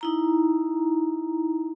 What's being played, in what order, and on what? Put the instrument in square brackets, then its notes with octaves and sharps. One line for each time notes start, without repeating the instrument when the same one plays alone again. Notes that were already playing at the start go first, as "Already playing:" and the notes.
[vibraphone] D#4 E4 A#5